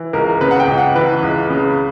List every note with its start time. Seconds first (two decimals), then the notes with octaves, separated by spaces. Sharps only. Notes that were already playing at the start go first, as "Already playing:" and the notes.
Already playing: E3
0.13 C#2 A#4
0.41 C#3 B4
0.51 F#5
0.60 G5
0.67 C#2
0.78 F#5
0.95 E3 B4
1.23 C#2
1.50 C#3